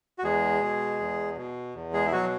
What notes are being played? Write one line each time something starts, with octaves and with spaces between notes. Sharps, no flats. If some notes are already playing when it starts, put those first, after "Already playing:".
F#4
E2 G#3 G#4
B2
E2
B2
E2
G#3 G#4
E4
B2 F#3 F#4